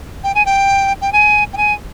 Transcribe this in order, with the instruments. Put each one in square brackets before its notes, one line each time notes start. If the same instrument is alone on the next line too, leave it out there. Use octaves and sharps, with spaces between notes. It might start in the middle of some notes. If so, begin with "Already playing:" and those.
[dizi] G5
G#5
G5
G5
G#5
G5
G#5